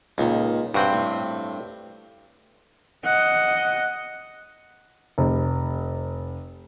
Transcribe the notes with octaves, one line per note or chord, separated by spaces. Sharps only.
C#2 A#2 D#3
G2 C4 F#4 F#5 G5
A2
D#5 F#5
F1